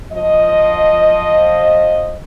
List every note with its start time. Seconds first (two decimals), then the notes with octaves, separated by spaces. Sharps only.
0.13 F3 D#5